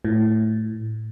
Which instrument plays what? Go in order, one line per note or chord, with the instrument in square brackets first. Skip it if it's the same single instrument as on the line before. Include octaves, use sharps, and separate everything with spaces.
[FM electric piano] A2